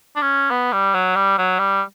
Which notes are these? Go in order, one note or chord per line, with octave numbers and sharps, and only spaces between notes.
D4
C#4
B3
G3
F#3
G3
F#3
G3